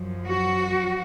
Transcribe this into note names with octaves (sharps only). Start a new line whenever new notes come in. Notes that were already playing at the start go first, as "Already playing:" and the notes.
Already playing: F#2 F3
F#4